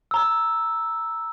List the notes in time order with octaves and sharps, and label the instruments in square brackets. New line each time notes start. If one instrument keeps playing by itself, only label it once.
[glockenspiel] A#5 E6